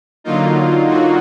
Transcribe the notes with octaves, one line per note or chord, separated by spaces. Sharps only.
D3 F#3 A#3 D#4 F4
F#4